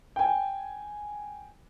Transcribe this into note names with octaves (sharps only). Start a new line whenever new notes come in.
G5 G#5